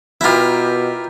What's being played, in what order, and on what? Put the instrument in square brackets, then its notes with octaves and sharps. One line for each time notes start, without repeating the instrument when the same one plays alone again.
[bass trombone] B2 [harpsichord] E4 F4 [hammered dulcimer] G4 A#4 B4